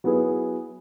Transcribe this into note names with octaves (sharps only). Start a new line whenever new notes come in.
F#3 B3 E4 G#4 B4